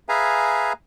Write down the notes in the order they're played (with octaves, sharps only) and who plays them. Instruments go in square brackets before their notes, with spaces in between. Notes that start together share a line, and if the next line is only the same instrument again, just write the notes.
[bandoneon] G#4 B4 E5 F5 G#5 A#5